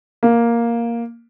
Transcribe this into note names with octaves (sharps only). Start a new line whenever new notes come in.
A#3